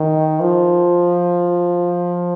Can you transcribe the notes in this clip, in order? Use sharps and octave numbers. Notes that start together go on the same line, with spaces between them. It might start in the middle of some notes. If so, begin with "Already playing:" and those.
Already playing: D#3
F3